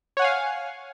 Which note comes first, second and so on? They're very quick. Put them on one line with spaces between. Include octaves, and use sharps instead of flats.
C#5 F#5 G#5 F5